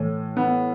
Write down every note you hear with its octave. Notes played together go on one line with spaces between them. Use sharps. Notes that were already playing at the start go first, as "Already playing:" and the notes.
Already playing: A2 E3
B3